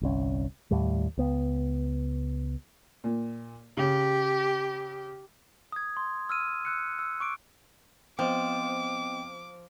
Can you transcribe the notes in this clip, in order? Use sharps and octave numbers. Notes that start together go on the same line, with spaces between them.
G1 C2 C#4
D#2 A2 G3
C#2 B3
A#2
C#3 G4
D#6 G#6
C6
E6 F6 D#7
E6 F#6 C#7
E6
C#6 D6 D7
F3 B3 C4 D#5 G5 D6